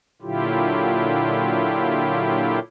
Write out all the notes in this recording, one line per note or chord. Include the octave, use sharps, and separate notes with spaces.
A#2 D3 F#3 E4 F4 G4